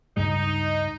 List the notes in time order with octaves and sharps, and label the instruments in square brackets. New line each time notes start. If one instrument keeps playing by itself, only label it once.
[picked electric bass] C#2 G2 G#3 [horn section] D#4